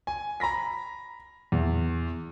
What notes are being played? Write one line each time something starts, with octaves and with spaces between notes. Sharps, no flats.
G#5
A#5 B5 A#6 B6
E2